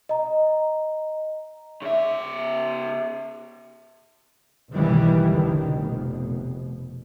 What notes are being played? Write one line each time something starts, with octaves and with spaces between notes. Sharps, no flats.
D#5 A#5
C#3 E5
F#1 B1 D#3 E3 G3
F1 D3 D#3
F1 B2